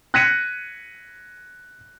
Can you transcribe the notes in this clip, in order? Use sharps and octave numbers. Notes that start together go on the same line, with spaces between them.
F#6 G#6 A#6 B6 C#7 D#7